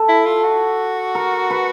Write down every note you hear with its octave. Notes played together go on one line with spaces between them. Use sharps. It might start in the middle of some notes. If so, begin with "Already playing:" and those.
Already playing: A4
E4
F4
F#4
A#4
B4